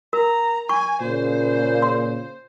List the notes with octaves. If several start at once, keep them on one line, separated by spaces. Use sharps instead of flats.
A#4 A#5
G#5 C#6
A#2 C#3 C5
C6